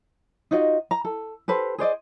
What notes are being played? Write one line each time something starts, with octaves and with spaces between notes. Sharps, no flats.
D#4 F4 F#4 D#5
A#5
A4
G4 A4 B4 C5
G#4 C5 D5 D#5